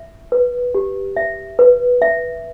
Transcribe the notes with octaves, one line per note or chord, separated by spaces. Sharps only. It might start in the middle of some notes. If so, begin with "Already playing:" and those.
Already playing: E5
B4
G4
E5
B4
E5